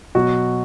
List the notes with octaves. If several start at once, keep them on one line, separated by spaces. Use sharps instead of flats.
B2 F#3 F#4